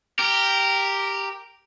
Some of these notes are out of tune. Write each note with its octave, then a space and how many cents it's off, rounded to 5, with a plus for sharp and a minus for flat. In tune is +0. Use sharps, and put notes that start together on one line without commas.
G4 +0 A#4 -5